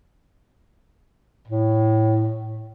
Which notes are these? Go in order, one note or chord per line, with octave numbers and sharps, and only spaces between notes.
A2